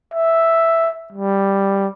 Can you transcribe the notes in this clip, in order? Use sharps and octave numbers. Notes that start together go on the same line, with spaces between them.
E5
G3